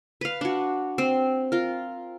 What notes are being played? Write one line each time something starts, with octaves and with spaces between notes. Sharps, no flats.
B4 F5
D4 F#4
C4
F4 A#4